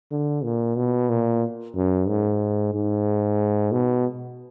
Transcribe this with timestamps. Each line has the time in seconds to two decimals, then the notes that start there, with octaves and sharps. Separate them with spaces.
0.11 D3
0.44 A#2
0.77 B2
1.09 A#2
1.76 F#2
2.08 G#2
2.75 G#2
3.72 B2